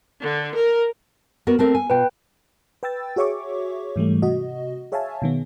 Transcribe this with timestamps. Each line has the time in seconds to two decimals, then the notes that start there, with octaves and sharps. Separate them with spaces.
0.21 D3
0.55 A#4
1.47 B3 F#4 A#4
1.59 A3 C4 A#4
1.75 G#5
1.90 B2 F4 B4 G5
2.83 B4 G5 E6 A6
3.16 F#4 G#4 C#5 E5 C#6 D6
3.96 G#2 E3 G3 A3
4.22 C3 F#4 D#5
4.92 G#4 C#5 E5 F5 G#5 A5
5.22 B2 D#3 B3